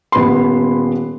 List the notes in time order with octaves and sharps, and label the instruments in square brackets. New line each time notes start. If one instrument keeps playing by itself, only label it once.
[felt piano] D#1 B3 B5 C6